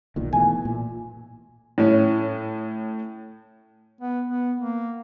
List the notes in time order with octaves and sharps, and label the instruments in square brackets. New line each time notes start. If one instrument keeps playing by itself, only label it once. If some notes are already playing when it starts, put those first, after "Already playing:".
[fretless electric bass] B1 A#2 D#3
[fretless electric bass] B2 E3 A3 [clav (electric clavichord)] G#5
[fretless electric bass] A#2
[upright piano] A2 C#4
[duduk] B3
B3
A#3